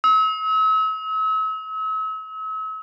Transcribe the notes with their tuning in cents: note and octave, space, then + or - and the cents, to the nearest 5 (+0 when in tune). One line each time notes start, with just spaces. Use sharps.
E6 -40